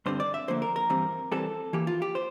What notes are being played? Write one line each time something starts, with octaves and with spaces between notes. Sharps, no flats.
G2 D3 G3 C4 C5
D5
E5
D2 D3 F3 A#3 C5
A#4
A#4
G2 E3 G3 C4
C2 C3 E3 G3 C4 A4
E2 E3 A#3 G4
F4
G4
C5